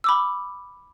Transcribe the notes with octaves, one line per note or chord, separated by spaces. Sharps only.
B5 D6 E6